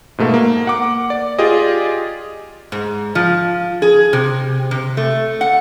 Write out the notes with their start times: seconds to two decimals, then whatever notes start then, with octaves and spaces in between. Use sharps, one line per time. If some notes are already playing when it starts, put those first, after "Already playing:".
0.18 G#2 B2 A3 A#3
0.34 A#3
0.67 F#5 D6
1.10 D5
1.39 F4 G4 G#4 D5 D#5
2.72 G#2
3.15 F3
3.82 G#4
4.13 C3
4.71 C3
4.97 A3
5.41 F#5